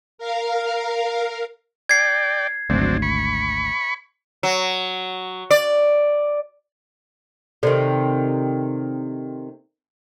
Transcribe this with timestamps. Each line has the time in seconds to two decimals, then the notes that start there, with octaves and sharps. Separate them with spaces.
0.18 A#4 F5
1.89 D5 G5 G#6 C7
2.70 G#1 D2 F#3 C4 D4
3.02 B5 C#6
4.43 F#3
5.50 D5
7.63 C3 D#3 A4 C5 D5